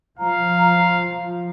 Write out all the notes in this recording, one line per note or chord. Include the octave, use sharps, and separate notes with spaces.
F3 F5 A#5